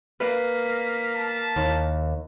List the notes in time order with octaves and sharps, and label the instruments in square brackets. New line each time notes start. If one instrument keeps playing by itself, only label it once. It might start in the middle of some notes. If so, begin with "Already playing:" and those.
[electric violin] A#3 B6 [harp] B4 D5 F5
[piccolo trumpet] A5
[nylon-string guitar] D#2